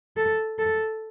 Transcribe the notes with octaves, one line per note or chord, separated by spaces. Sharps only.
A4
A4